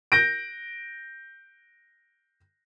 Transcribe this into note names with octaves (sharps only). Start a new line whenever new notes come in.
G6 A#6 D7